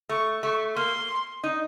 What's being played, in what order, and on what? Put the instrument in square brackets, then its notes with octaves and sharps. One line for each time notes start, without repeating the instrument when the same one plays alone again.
[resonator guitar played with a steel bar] A3 [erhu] C#6
[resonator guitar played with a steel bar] A3 [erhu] C#6
[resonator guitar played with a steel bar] A#3 [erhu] C6
[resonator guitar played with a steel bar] D#4